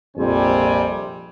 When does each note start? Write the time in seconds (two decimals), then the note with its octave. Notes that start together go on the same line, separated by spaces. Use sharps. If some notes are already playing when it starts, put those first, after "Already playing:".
0.17 A#1 F2 C3 G3 C4 G#5